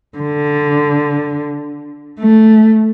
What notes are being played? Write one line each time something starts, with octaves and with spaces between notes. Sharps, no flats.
D3
A3